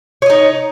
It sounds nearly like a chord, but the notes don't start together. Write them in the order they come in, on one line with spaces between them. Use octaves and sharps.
C#5 D#5 D#4